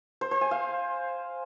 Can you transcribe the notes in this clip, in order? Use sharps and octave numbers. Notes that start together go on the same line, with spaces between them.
C5
C5
G#5
F5